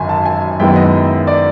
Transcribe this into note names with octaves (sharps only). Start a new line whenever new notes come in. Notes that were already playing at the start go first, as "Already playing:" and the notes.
Already playing: G#1 F#2 D3 G#5
A5
G#5
F#2 D#3 G#3 B3 E4 G5
D#5
D5